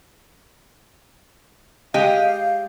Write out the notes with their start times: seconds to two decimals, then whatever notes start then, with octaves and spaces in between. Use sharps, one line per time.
1.94 G#3 G4 D#5 F5